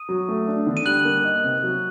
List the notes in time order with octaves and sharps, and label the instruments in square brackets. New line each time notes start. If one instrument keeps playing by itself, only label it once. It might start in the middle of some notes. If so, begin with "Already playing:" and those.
Already playing: [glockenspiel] D#6 D#7
[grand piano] F#3
A3
D4
D3
[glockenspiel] D#7
[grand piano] G3 [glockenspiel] F#6 F#7
[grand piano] A#3
D#4
C3
F#3